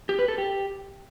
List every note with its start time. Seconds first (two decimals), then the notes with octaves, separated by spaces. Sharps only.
0.09 G4
0.19 B4
0.28 A4
0.38 G4